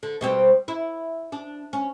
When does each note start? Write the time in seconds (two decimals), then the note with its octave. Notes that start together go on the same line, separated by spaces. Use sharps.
0.03 D3
0.21 B2 G3 C4
0.68 E4
1.32 D4
1.73 C#4